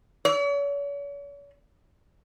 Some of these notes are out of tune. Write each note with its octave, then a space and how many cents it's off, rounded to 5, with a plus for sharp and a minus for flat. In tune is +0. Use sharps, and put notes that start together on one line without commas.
C#5 +40